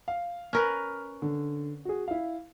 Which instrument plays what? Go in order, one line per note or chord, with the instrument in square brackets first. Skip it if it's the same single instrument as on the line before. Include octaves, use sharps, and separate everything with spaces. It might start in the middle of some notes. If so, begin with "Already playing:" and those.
[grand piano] F5
[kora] C#4 A#4 B4 [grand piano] F6
[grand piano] D3
F#4 G#4
E4 F5